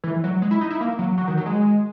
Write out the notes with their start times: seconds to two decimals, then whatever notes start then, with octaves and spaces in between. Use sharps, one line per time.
0.04 E3
0.24 F#3
0.42 G#3
0.51 E4
0.61 D#4
0.70 E4
0.81 A#3
0.99 F#3
1.18 F#3
1.28 D#3
1.37 F#3
1.46 G#3